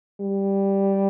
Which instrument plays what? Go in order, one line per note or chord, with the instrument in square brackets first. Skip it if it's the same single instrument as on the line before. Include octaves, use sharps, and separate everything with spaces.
[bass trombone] G3